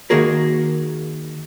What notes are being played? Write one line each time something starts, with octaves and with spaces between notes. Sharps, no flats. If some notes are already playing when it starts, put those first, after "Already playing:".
D#3 A#3 F#4 G#4 A#4